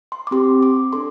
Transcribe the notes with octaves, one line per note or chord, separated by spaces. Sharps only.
C6
D6
C4 G4 C6
D6
D4 A4 C6